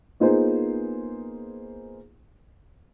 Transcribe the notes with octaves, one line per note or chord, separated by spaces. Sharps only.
A#3 B3 D#4 F4 G#4 C5